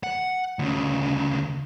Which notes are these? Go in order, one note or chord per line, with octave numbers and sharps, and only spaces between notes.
F#5
D2 C#3